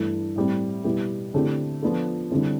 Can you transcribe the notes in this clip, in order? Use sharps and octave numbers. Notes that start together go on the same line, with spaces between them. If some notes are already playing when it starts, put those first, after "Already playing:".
Already playing: G2 E3 A3
A2 G3 C4
B2 G3 B3 E4 G4
D3 A3 C4 E4 G4
F3 B3 D4 F4 A4
D3 G3 C4 E4